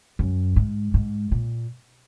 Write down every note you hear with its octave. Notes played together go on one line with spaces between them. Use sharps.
F#2
G#2
G#2
A#2